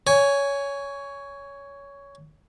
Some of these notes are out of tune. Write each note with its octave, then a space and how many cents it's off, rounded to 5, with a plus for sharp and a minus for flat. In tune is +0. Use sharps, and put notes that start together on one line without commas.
C#5 +15 G#5 +0